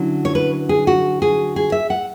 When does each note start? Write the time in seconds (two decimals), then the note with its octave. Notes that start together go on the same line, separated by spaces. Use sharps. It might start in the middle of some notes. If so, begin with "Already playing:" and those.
Already playing: D3 F#3 C#4 E4
0.25 C#5
0.35 B4
0.69 G#4
0.87 F#4
1.22 G#4
1.56 G#4
1.72 E5
1.90 F#5